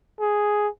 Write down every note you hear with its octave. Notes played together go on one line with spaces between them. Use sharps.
G#4